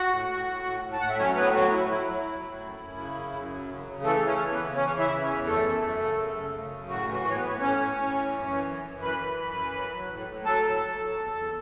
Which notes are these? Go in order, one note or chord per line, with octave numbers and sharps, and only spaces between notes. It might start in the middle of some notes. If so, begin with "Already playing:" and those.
Already playing: F#4 F#5
A2
A2
A2
A2
A2
A5
A2 F#5
E5
F#3 C#4 C#5
A2 B3 B4
F#3 F#4
F#3 E4
F#3 E4
F#3
F#3
A2
F#2
F#2
C#3
F#2
F#2
F#3
C#3
C#3
E3 A3 A4
E3
C#4 C#5
E3
B3 B4
C#3
E3 C#4 C#5
C#3
E4 E5
E3
C#4 C#5
E2
F#2 A3 A4
F#2
F#2
C#3
F#2
C#3
C#3
F#2
A2 F#4
E3
F#4
A2
C#5
B3 B4
A2
A2 C#4 C#5
A2
A2
E3
F#2
E3
F#2
F#2
E3 B4 B5
E3
F#2
E3
F#3
F#3
A2
A2
F#3 A4 A5
A2
F#3
F#3
E2
E2